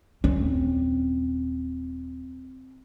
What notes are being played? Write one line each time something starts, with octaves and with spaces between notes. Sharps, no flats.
D#1 C4 C#4